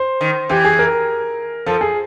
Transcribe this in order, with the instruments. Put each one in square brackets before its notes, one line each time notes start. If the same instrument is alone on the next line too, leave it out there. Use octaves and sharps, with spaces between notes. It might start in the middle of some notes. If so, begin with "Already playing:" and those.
Already playing: [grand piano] C5
[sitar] D#3
[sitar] E3 [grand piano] G4
[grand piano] G#4
A#4
[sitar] F3 [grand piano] A4
[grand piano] G#4